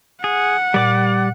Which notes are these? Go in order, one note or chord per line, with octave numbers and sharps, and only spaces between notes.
G#4 F#5
A#2 G3 D5 D6